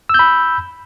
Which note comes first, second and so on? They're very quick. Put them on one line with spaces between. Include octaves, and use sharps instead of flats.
E6 G6 B5